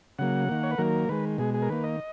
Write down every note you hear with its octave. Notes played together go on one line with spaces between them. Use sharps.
C#3 F#3 A#3 F#5
D#3 A#3
C#5
B4
D#3 F#3 A#3 A#4
D#3 G#3 B4
B2 G#3 G#4
G#4
A#4
D#3 A#3 B4
D#5